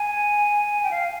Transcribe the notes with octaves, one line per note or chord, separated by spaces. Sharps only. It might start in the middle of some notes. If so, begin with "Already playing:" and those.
Already playing: G#5
G5
F5